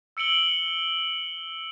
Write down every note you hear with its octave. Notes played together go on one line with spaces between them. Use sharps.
E6 C#7 D7 F#7 G7